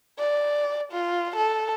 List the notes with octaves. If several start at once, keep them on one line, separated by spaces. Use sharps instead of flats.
D5
F4
A4